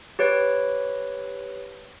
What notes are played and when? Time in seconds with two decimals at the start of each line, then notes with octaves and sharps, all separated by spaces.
0.19 G4 B4 C#5